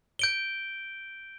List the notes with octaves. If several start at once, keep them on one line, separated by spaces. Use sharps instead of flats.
G6 D7 G7